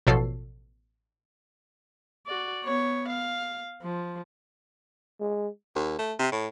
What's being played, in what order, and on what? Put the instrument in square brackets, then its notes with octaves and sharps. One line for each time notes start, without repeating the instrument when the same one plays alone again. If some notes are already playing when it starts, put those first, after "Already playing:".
[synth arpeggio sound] A1 B2 F3 A4 C#5 C7
[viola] F#4 D5
B3 C#5
F5
F3
[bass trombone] G#3
[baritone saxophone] D#2
A3
C3
A2